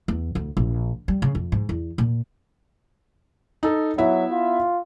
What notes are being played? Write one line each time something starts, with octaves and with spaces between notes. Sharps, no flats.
E2
D2
A#1
G3
C#3
F2
G#2
E2
A#2
D#4 A4
F#3 B3 E4 E5
F4